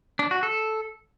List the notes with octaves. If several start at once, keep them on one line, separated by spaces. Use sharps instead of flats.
D4
F#4
A4